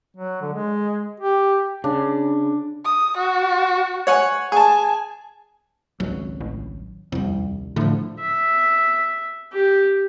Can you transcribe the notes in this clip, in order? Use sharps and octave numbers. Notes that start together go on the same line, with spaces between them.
F#3
D3
G#3
G4
C#3 D4
D#6
F#4
C#5 F#5 G#5
G#4 G#5 A5
G#1 C#2 F#3
A1
D#1 C2 F2
A2 D3 F3
E5
G4